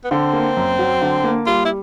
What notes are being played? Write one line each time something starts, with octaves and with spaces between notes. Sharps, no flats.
B3
D3 C4
A#3
F#2
F#3
D3
A#3
G3 F4
E4